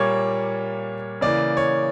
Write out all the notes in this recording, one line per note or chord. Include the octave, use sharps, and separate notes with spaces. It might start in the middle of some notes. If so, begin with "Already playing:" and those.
Already playing: A#2 G3 A#3 C#5
C#3 E3 A#3 D5
C#5